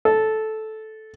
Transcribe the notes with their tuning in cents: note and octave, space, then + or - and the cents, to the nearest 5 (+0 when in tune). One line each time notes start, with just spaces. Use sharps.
A4 -10